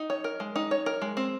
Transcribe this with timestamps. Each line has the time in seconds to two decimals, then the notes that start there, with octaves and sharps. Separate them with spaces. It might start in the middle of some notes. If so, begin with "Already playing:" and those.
Already playing: D#4
0.10 C#5
0.24 A#4
0.40 G#3
0.56 D#4
0.71 C#5
0.86 A#4
1.02 G#3
1.17 C4